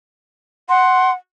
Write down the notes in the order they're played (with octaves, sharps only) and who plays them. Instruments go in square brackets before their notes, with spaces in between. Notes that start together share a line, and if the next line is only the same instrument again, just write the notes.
[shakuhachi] F#5 [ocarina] C6